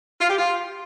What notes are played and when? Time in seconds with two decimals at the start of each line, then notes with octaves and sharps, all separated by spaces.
0.21 F4
0.30 G4
0.39 F4